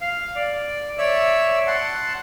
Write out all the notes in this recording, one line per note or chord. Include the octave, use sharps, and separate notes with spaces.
F5
D5
C#5 D5 E5 E6
F#5 A5 C6